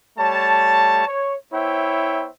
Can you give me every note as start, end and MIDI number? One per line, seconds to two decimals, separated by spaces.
0.18 1.04 55
0.18 1.04 57
0.18 1.04 73
0.18 1.04 81
1.07 1.35 73
1.52 2.28 59
1.52 2.28 64
1.52 2.28 72
1.52 2.28 73
1.52 2.28 76
1.52 2.28 79